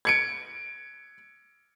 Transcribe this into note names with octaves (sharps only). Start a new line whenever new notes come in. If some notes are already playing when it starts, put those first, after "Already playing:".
G#6 C#7 D7